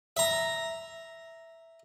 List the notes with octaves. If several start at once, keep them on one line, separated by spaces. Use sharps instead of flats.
E5 A#5